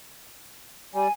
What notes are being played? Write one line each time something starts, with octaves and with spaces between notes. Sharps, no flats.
G3 G#5